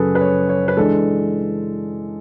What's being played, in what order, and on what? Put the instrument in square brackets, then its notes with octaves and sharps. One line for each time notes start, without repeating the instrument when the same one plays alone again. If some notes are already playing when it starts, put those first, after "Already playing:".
Already playing: [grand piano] F#2 C#3 F#3 [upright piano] G#4 A4 B4
[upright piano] B4
C#5
C#5
B4
[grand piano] E3 G#3 D4 [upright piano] A4